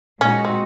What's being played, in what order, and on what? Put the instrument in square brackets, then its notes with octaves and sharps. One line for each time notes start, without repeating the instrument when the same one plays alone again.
[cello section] A#2 G#3 D#4 F#4 [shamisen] C#4
[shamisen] C4